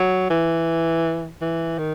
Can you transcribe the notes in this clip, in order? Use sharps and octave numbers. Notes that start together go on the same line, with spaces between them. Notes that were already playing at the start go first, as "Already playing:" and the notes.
Already playing: F#3
E3
E3
D#3